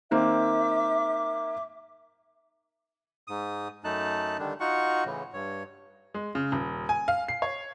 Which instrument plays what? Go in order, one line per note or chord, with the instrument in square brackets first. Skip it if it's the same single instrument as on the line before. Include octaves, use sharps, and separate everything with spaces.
[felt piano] D#3 A#3 C4 [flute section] E5 D6
[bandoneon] G#2 D#6
F#2 A3 D#4 A5 F#6
D3 D#3 G3 D4
D#4 F4 F#4 F#5 C#6
A2 C#3 E3
G2 C#5
[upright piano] G#3
C#3
D#1
G#5
F5
C7
C#5